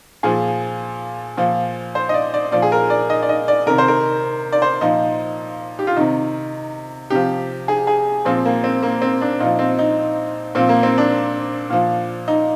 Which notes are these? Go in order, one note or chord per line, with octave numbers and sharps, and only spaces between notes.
A#2 F3 G#4
A#2 F3
C5
D#5
D5
D5
A#2 F3 D5
G#4
A#4
D5
D#5
D5
D#5
D5
C3 D#3 A#4
C5
A#4
D5
C5
A#2 F3 D#4
G4
F4
C3 D#3 D#4
C3 F3 G4
G#4
G#4
A#2 F3 C4
A#3
C4
A#3
C4
D4
A#2 F3 D#4
C4
D#4
A#2 F3 C4
A#3
C4
D4
A#2 F3
D#4